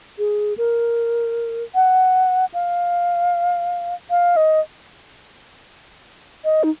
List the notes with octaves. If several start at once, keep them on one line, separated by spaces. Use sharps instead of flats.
G#4
A#4
F#5
F5
F5
D#5
D#5
D#4